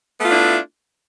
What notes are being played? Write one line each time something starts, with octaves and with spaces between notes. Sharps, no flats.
A3 B3 D4 E4 F4